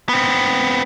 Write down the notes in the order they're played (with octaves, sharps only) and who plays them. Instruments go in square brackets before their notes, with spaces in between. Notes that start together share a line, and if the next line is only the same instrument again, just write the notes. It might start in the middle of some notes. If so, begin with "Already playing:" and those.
[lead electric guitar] B3 C4